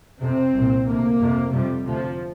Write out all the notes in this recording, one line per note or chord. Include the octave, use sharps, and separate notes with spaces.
F2 C3 C4
C2 A#2
D2 C3 A#3
F2 C3
F2 C3 G3
D2 C3 F3